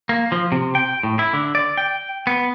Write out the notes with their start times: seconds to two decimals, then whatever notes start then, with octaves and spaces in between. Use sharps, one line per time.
0.09 A#3
0.32 F3
0.52 C3
0.75 G5
1.03 A2
1.19 E4
1.33 D3
1.55 D5
1.77 G5
2.27 B3